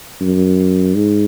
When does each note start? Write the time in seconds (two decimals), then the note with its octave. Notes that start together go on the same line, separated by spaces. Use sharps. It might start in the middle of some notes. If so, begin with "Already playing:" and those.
0.21 F#2
0.95 G#2